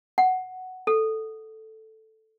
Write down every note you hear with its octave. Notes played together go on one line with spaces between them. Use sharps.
F#5
A4